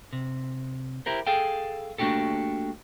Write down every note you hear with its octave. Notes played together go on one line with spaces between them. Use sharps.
C3
E4 G4 A#4 C5
G#4 A4 F5 G5
A3 A#3 D4 F#4 G4 A4